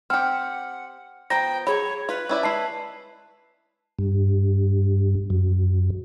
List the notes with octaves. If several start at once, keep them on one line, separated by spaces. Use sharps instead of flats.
C4 G4 F#5 G5 F6
F3 B3 G5 A#5 A#6
F#3 G#4 C#5 B5
F4 B4
C#4 E4 D5
G#3 E4 A5 C7
G2
F#2